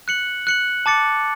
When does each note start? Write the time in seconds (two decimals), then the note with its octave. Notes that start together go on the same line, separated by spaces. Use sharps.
0.08 F#6 C#7 F#7
0.47 F#6 C#7 F#7
0.86 A5 D6 A6 C#7